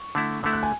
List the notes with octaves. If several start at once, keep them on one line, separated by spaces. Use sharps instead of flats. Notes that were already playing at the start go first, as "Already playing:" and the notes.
Already playing: C#6
D3 A3 E4
D3 A3 E4 E6
F#6
G#5